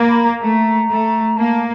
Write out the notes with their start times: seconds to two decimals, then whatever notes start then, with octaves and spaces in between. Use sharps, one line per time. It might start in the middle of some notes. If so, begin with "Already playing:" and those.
Already playing: A#3
0.08 B5
0.24 A#5
0.41 A3
0.89 A3
1.37 A#3 A5